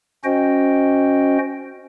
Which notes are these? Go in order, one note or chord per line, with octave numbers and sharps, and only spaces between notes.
C#4 F#4 C5 D#5 G5